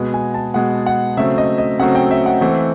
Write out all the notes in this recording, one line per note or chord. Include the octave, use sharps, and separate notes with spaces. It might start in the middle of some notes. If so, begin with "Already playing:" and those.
Already playing: B2 G#3 B3 D#5
G#5
A5
B2 G#3 B3 F#5
F#5
C#3 F#3 A3 C4 E5
D#5
D#5
C#3 F#3 A3 C4 F#5
G5
E5
F#5
E3 A3 C4